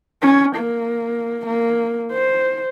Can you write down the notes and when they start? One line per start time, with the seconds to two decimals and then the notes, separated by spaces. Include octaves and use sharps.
0.22 C#4
0.56 A#3
1.47 A#3
2.12 C5